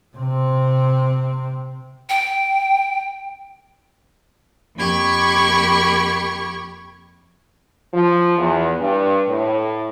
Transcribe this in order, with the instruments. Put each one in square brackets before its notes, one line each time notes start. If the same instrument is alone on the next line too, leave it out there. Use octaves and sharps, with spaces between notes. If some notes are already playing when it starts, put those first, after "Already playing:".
[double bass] C3 C4
[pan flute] G5
[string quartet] F2 A#3 G4 B5 C#6 G#6
[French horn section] F3
E2
G2
A2